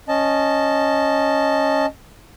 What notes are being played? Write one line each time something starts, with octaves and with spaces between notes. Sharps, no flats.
C#4 D#5 A5